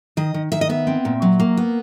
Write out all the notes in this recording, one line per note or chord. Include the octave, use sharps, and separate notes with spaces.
D#3 D#5
D#3
D#3 E5
D#5
B3 E5
C4
A#2
F#3
A#3
B3